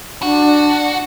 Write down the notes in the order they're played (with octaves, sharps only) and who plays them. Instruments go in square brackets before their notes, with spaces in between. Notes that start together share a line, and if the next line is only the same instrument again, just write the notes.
[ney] D4 [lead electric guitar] F#4